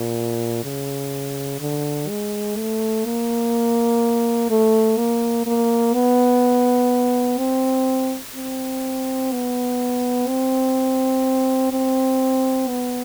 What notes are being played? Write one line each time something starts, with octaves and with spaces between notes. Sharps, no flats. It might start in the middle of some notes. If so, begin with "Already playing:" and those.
Already playing: A#2
C#3
D3
G#3
A3
A#3
A3
A#3
A#3
B3
C4
C4
B3
C4
C4
B3